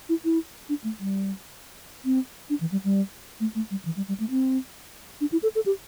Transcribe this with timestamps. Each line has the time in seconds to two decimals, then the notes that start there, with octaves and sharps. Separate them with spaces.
0.09 E4
0.25 E4
0.69 D4
0.84 A3
1.00 G3
2.05 C4
2.50 D4
2.61 E3
2.72 G3
2.84 G3
3.40 A3
3.55 A3
3.71 G3
3.85 E3
3.97 G3
4.08 G3
4.20 A3
4.30 C4
5.21 D4
5.32 E4
5.43 A4
5.55 A4
5.66 G4